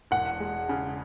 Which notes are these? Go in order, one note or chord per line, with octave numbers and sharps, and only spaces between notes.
E1 F#5
G#3
C#3